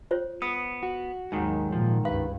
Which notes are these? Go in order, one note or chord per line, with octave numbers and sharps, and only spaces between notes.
F4 C5 C#5
B3 D#6
F#4
D#2 G#2 D#3 F#3
A#2 F3
C#2 G2 B4 F5